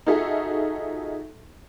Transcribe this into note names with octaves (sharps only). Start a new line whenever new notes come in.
D#4 F4 F#4 G#4 A4 E5